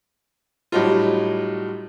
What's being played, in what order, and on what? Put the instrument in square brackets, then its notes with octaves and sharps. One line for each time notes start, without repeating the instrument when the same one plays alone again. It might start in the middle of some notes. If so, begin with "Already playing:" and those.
[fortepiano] A2 F#3 G3 D#4 F4